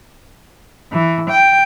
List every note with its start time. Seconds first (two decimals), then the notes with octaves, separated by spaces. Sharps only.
0.92 E3
1.30 G5